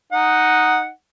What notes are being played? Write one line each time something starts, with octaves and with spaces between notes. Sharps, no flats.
D#4 F#5